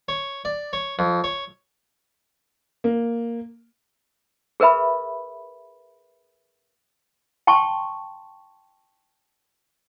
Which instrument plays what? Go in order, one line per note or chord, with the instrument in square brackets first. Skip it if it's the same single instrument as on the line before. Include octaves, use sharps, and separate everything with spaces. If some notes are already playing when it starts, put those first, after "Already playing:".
[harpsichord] C#5
D5
C#5
F2
C#5
[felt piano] A#3
[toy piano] G#4 A#4 B4 E5 B5
G5 A5 C6 C#6